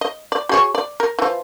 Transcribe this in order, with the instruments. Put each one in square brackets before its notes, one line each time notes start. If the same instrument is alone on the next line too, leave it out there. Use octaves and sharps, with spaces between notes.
[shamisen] D#5
D5
F#4 G#4 C#5
D5
A#4
E3 F3